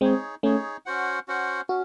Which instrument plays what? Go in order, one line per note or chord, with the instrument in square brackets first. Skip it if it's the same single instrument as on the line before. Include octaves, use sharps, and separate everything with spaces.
[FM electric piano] G#3 C4 [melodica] D#4 G#4 C#5
[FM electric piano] A3 C#4 [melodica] D#4 G#4 C#5
[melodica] C#4 F#4 C5 F#5
C#4 F#4 C5 F#5
[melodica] C#4 [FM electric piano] F#4